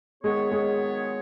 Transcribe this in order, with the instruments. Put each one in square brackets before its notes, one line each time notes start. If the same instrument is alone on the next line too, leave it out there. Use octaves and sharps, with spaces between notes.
[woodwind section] D#3 F#3 B3 G#4 C#5 [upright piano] G#3
[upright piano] G#3